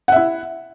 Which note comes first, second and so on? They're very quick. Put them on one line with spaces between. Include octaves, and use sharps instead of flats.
F#5 E5 E4